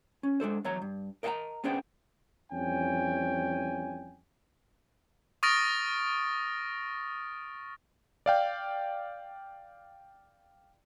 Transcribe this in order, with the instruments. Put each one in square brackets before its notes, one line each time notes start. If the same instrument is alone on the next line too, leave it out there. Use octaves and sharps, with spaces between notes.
[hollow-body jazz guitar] C#4
G#3 D4 A4 C5
E2 F#3 C#5 A#5
G2
A#4 D#5 E5 F#5 A5 A#5
B3 C#4 D4 G#4 C5 G5
[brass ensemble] F2 E3 G3 C#4 G5 G#5
[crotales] C#6 D#6 F6 A6 A#6 D7
[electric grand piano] D5 F5 G5